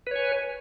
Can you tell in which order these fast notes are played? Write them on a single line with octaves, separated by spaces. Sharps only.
B4 C#5 G#5